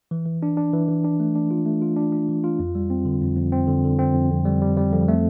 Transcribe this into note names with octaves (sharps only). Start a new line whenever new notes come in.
E3
E3
D4
D4
E3
E3
D4
A3
D4
F4
A3
F4
D4
D4
E3
F4
F2
G3
C4
D3
F2
F2
C4
D3
D3
C4
F2
F2
G3
G3
G3
F2
A3